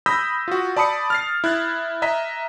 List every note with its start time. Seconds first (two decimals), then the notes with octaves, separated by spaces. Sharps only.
0.06 B5 D#6 E6 G6 A#6 B6
0.48 F4 F#4
0.76 D5 A5 B5 D#6 C#7
1.10 F6 A6 C7
1.44 E4 F#6 G#6 A6
2.02 D#5 E5 A#5 B6